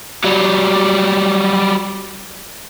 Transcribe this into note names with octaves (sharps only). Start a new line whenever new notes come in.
F#3 G3